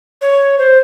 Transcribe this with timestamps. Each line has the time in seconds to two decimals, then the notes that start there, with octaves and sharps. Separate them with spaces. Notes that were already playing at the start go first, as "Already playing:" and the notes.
0.22 C#5
0.59 C5